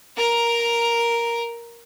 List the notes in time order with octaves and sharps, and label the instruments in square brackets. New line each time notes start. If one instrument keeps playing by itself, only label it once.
[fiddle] A#4 A#5